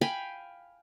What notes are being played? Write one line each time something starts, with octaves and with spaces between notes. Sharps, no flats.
F5 G5 G#5 B5